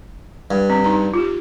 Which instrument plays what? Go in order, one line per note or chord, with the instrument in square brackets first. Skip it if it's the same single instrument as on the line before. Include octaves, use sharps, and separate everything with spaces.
[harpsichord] G2
[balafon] C4
D#4 A#5
F4 G4